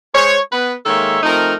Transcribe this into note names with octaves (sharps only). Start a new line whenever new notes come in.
G#3 G#4 C5 C#5
B3 B4
D#3 G#3 A#3 A4 C#5 E5
F3 A3 C4 D#4 A#4